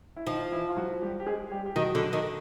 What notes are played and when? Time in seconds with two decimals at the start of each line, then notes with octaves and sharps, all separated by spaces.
0.16 E4
0.27 D#3 F3 D#4
0.52 E3 E4
0.69 F4
0.77 F#3 F#4
1.02 G3 G4
1.20 G4
1.26 G#3 G#4
1.51 G3 G4
1.66 G4
1.76 D#3 F#3 F#4
1.95 D3
2.13 D#3